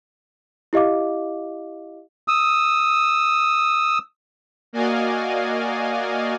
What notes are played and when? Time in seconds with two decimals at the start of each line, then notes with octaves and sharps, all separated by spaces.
0.73 E4 G4 D#5 F5 D6
2.28 D#6 E6
4.73 A#3 F#4 D5 D#5 F5 G#5